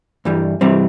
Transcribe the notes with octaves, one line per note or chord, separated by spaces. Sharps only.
G2 E3 G3
G2 C3 E3 G3 C4